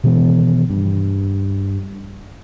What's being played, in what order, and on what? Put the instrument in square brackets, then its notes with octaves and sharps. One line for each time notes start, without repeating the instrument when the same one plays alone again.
[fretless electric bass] B2 D#3 E3 B3
G2